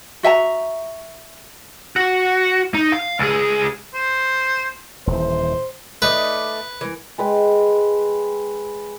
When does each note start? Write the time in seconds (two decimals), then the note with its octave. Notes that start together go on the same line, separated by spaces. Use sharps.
0.23 F#4 E5 G#5 A#5
1.96 F#4
2.74 D#4
2.92 F5
3.19 C#2 G#4
3.94 C5
5.07 D#1 E3 C5
6.02 A3 D#4 B4 D5
6.81 E3 A#4
7.18 G#3 B4 G5